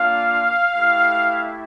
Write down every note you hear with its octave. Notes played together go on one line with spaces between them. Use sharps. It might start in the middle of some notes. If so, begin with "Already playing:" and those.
Already playing: A#3 D4 F4 F5
A3 E4 G4